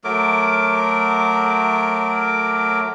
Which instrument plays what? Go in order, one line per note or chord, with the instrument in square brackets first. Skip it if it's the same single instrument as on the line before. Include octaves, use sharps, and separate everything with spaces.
[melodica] F#3 A3 A#4 D6